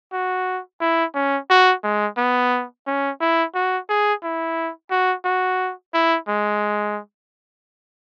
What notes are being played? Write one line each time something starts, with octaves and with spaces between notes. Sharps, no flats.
F#4
E4
C#4
F#4
G#3
B3
C#4
E4
F#4
G#4
E4
F#4
F#4
E4
G#3